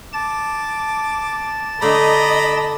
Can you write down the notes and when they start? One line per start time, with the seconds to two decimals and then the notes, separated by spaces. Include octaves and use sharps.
0.13 A5 D6 A6
1.82 D3 A3 D#5 A#5 B5 D6